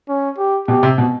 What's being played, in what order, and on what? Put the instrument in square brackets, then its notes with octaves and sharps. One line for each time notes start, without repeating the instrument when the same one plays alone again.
[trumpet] C#4
G4
[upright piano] B2 [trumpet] G4
[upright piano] C3
B2